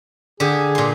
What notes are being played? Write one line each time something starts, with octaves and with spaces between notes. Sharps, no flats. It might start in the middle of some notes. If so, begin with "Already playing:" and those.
D3 G4 G#4
A#2 C6